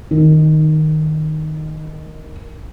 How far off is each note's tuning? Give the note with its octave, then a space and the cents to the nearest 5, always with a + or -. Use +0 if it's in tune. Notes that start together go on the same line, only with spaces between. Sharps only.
D#3 -5